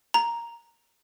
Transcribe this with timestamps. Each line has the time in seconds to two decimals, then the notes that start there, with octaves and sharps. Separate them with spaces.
0.14 A#5